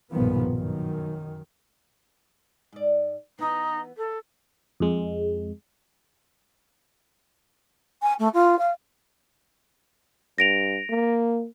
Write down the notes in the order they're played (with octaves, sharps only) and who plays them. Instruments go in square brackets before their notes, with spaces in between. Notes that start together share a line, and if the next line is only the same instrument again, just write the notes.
[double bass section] B1 G2 A#2 D#3 F3 B3
F#2 D#3
[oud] G#2 D5
[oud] E3 B3 [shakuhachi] D#4
[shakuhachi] A4
[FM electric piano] F2 G#3
[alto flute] G#5
A3
F4
F5
[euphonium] G2 [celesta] A#6 D7 F7
[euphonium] A#3